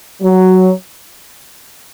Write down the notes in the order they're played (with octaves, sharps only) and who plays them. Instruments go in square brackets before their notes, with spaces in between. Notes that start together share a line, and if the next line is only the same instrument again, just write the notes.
[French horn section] F#3